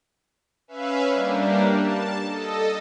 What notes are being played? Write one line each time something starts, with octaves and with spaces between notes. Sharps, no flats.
C#4 B4 E5 F5
G3 A#3 D4
A5
A4 D#5